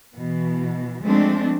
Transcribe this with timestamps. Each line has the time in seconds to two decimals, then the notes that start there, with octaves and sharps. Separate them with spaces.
0.16 B2 E3
1.03 F3 G#3 A3 C4 D4